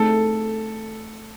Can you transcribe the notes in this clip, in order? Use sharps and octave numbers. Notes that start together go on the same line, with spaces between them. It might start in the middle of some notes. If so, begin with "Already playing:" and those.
Already playing: A3 C4 D#4 G#4 A4